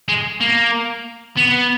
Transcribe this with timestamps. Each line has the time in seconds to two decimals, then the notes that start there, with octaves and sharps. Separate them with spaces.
0.08 G#3
0.40 A#3
1.37 B3